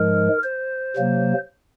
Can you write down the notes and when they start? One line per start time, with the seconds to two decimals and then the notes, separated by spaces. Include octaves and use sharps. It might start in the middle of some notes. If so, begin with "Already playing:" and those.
Already playing: G#2 F3 G#3 A#4
0.44 C5
0.96 C3 F#3 A#3